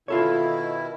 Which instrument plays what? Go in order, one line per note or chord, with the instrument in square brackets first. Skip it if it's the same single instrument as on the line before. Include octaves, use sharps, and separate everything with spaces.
[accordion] B2 D#3 E4 [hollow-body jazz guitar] F4 A4 C#5